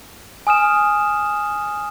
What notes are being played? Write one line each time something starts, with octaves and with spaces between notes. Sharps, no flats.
G#5 D#6 F6 E7